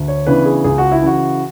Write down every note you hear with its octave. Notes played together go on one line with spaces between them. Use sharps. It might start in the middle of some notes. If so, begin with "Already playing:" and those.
Already playing: D2
C#5
C#3 E3 B3 D4 B4
G#4
C#2 G#4
F#4
E4
C#3 E3 F#4